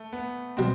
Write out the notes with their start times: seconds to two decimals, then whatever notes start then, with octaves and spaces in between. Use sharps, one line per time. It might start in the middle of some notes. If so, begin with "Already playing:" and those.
Already playing: A3
0.13 B3
0.57 B2 G3 C4